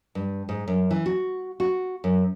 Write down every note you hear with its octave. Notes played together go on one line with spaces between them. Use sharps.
G2
G#2
F#2
E3
F#4
F#4
F#2